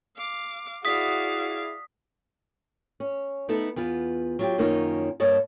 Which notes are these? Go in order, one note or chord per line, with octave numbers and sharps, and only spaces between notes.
F5 D6
E4 F#4 G#4 D5 F5 D#6 B6
C#4
A3 B3 D#4 E4 A4
E2 B3 F4
F#3 F4 G4
F#2 D#3 A#3 C#4 D#4 F4
G2 A#3 C#5 D#5 A5